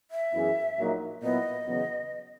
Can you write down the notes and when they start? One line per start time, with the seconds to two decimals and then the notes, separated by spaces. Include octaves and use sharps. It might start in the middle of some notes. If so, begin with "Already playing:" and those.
0.11 E5
0.34 F#2 E3 B3 E4 G#4
0.77 A#1 A#2 F#3 A#3 D#4
1.22 A#2 F#3 B3 E4 D#5
1.66 E2 C#3 F#3 B3